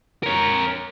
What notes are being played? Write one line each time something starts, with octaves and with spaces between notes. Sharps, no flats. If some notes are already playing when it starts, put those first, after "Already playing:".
A#4 C#5